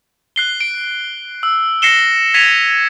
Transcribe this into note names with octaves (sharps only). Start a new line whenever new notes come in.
F#6 C7 G7
D7
E6
A#6 C7 C#7 E7 G7
G#6 A#6 B6 C#7 D#7 F7